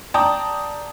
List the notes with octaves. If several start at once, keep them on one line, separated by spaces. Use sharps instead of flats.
D5 G5 A5 A#5 D6 D#6